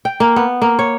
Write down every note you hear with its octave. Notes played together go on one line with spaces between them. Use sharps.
G5
A#3
B3
A#3
C#5